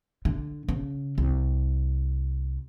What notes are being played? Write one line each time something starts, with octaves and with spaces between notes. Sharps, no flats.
D3
C#3
C2